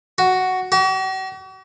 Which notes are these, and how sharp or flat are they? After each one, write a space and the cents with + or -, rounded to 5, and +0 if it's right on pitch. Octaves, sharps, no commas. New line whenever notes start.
F#4 +5
F#4 +45